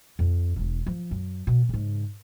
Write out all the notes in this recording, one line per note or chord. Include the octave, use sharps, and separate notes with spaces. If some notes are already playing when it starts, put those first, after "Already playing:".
F2
E1 D4
F3
F#2
B2
G#2 C#3